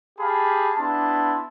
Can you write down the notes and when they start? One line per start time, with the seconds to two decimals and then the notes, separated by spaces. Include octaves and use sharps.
0.19 G4 G#4 F5 A5 B5
0.78 B3 D4 E4 A5 C6